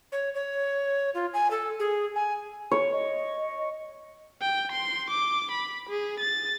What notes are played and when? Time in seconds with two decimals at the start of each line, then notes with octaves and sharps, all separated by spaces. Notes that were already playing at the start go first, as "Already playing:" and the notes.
0.12 C#5
0.34 C#5
1.15 F4
1.34 G#5
1.51 A4
1.79 G#4
2.16 G#5
2.71 C#5
2.93 D#5
4.42 G5
4.72 C6
5.10 D6
5.52 B5
5.89 G#4
6.20 A6